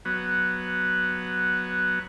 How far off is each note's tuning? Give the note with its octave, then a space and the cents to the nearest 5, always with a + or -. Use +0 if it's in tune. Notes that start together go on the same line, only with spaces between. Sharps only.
F#3 +0 B3 +0